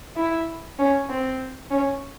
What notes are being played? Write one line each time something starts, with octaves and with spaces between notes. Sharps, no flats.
E4
C#4
C4
C#4